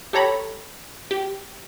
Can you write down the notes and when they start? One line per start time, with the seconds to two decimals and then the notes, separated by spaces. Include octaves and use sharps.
0.13 G4 A4 C#5 A#5 B5
1.11 G4